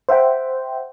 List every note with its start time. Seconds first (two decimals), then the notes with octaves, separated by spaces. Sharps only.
0.09 C5 E5 F#5 G5